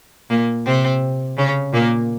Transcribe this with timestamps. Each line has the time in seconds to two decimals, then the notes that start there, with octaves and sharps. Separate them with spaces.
0.30 A#2 A#3
0.66 C3 C4
1.37 C#3 C#4
1.73 A#2 A#3